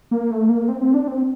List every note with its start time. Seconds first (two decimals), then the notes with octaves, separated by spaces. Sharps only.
0.11 A#3
0.31 A3
0.49 A#3
0.68 C4
0.81 C4
0.94 D4
1.08 C4